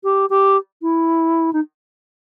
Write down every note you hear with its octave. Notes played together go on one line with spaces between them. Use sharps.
G4
G4
E4
D#4